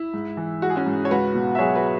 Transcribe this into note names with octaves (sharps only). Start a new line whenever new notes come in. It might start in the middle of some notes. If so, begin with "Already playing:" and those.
Already playing: E4
G#2
E3
G#3 F#4
G#4
C#4 F#4
G#2
C#5
C#2 F#4 B4
B2
E5
F#3 G#4 C#5
F#4 B4